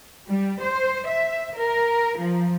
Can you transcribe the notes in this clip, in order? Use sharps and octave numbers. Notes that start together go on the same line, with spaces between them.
G3
C5
E5
A#4
F3